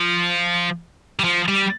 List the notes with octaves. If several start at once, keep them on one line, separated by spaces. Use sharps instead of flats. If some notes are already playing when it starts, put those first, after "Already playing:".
Already playing: F3
G3
F3
G3